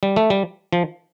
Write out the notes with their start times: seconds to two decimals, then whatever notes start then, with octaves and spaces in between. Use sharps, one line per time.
0.03 G3
0.16 A3
0.30 G3
0.73 F3